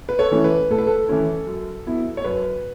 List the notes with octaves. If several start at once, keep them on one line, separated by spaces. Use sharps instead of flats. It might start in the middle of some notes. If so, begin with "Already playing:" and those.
B4
A4 C#5
E3 A3 C#4 E4
B4
A2 A4
B4
A4
E3 A3 C#4 E4
F#2
F#3 B3 E4
C#5
F#2 B4